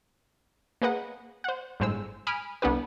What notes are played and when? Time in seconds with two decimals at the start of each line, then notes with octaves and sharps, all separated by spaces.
0.82 A#3 G#4 B4 D#5 F#5
1.44 C5 F#5
1.80 G1 A2 G#3 C5 E6
2.27 G#5 B5 D#6 F6 D7
2.62 C2 B3 D4 G4 B4